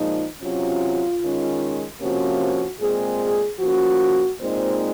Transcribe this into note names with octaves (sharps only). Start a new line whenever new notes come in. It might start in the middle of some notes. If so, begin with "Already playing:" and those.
Already playing: A#2 F3 G#3 D#4
C3 F#3 C#4 F4
D#3 G#3 C#4
C3 F3 A#3 C#4 F#4
A#2 G#3 C4 G#4
F3 A#3 C#4 F#4
A#2 G#3 C4 D#4 C5